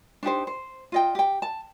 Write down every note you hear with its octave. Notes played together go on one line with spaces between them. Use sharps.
D4 D#4 G4 C5
C5
F4 D#5 G5
G4 G5
A5